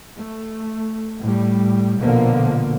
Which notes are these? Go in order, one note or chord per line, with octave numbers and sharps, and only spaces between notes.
A3
A2 G3
A#1 B2 D3 F3 A#3